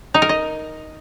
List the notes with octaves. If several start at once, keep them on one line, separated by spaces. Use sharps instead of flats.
D#4
A#4
D#5